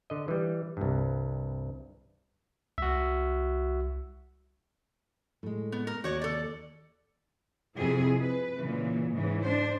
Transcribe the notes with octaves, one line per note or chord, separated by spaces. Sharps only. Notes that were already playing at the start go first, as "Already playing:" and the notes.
D3 D#5
E3 G3
C2 G2
C2 F#4 E5
A2 G#3
B3
A#4
D#2 F#4 C#5 D5
A4 D5
F2 C3 E4 G#4
B4
A#2 C#3 E3
G#2 C#3 E3
D4 C5